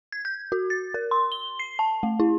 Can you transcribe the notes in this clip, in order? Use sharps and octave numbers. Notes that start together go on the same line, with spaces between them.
G#6
G6
F#4
A6
A#4
C6
G7
C7
A5
A3
E4